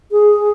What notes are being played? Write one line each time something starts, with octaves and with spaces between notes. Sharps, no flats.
G#4